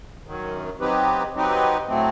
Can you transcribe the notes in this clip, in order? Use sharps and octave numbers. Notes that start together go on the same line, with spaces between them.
F#2 D#3 F#3
F#3 C4 D#4 G4 B4
F#3 C4 D#4 G4 B4
A2 F#3 A3 C4